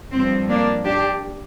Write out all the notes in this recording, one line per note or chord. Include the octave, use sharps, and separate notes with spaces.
G2 F3 C4
A#3 D4
D4 G4